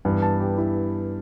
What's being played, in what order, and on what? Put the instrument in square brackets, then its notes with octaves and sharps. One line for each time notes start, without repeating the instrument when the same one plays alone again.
[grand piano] G2 E3 B3
A5
G4
E4